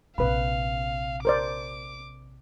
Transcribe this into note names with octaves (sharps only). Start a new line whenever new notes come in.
A#1 C3 B4 F5 B5
A#4 C5 D5 D6